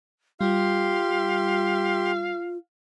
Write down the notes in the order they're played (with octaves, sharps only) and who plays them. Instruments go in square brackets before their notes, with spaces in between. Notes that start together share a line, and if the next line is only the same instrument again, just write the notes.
[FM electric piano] G3 [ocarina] F4 [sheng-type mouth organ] G4 C6 [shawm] F5